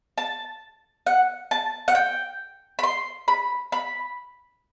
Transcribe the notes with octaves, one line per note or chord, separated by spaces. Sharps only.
A5
F#5
A5
F#5
G5
B5
C6
B5
B5